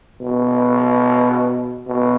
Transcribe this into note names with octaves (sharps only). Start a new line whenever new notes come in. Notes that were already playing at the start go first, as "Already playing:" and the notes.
B2
B2